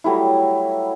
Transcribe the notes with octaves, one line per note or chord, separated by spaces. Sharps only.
F#3 G3 A3 E4